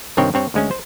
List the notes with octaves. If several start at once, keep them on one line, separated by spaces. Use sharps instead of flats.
C2 G2 D#3 C4 C#5 G5
G2 C4 C#5
D2 G#3 C#4
C5